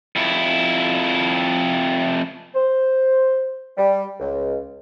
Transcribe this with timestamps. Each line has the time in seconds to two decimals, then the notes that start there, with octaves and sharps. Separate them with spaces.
0.16 F2 E4
2.55 C5
3.78 G3
4.20 C#2